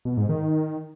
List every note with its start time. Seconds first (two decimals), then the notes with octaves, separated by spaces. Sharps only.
0.05 B2
0.17 G#2
0.29 D#3